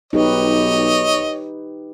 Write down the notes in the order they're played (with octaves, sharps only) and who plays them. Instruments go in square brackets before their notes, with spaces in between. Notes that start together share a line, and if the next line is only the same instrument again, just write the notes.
[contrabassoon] B1 [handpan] D#4 G4 B4 [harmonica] C#5 D#5